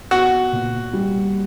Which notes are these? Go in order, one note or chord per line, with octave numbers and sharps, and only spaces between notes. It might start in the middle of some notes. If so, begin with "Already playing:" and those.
B3 F#4
A#2
G3